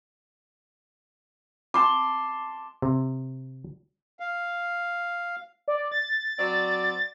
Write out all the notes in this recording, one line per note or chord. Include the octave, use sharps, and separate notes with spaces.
A5 C6 D6
C3
F5
D5
A6
F#3 C4 D5